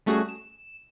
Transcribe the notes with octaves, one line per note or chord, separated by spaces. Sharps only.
G3 A3 C#4 F#4 G#4
E7